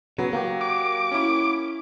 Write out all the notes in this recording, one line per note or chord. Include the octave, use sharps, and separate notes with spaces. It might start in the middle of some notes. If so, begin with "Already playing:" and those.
C#3 F#3 B3
A#3 F#4 G4
D6
C#4 E4